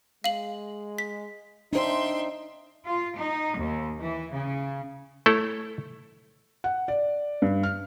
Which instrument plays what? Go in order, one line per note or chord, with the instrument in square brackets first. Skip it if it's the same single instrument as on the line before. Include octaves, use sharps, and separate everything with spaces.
[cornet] G#3 [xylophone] F5 F#7
[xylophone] B6
[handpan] D4 C5 [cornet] D#4 [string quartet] E5 G5 C6
[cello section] F4
D#4
D#2
E3
C#3
[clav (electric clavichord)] A3 E4 A4 C#5
[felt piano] F#5
D5
G2
F6